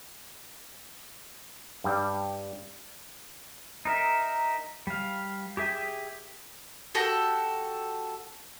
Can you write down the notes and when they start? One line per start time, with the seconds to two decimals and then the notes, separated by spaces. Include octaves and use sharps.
1.84 G2 G3
3.85 D#4 A#4 E5
4.87 G3 F5
5.57 G4 G#4 E5 G5 G#5
6.95 F#4 G4 A4